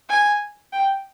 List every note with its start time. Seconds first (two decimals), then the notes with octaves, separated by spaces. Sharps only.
0.09 G#5
0.73 G5